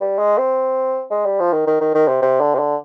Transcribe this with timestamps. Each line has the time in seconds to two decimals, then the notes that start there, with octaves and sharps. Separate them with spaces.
0.01 G3
0.18 G#3
0.38 C4
1.11 G#3
1.26 G3
1.40 F3
1.53 D#3
1.67 D#3
1.81 D#3
1.94 D#3
2.08 C3
2.22 C3
2.41 D3
2.55 C3
2.59 D3